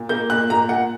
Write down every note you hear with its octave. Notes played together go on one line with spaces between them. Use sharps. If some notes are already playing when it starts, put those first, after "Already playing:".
Already playing: A#2
A#3 G6
A#2 F#6
A#2 A#5
A#2 F#5